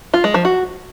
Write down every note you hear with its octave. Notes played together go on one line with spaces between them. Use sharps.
F4
G#3
F3
F#4